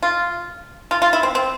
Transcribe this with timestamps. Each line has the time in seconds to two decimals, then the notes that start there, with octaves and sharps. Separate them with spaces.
0.03 F4
0.91 F4
1.02 F4
1.13 E4
1.23 C4
1.35 C4